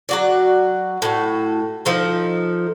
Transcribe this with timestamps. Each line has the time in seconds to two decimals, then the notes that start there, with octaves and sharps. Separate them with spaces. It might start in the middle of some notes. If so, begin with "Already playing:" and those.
0.09 F#3 F#4 D5
1.02 A2 F#4
1.85 F3 D#4 A4